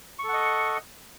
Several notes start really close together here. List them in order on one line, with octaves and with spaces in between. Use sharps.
C#6 A4 F#5 D#5